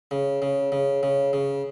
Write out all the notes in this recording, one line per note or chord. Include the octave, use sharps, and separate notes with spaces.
C#3
C#3
C#3
C#3
C#3